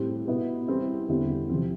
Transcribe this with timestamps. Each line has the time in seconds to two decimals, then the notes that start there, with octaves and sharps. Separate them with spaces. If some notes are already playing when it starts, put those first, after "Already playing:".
Already playing: A2 G3 C4
0.27 B2 B3 E4
0.68 E3 G3 C4 E4
1.08 E2 D3 G3 C4 E4
1.49 C3 F3 C4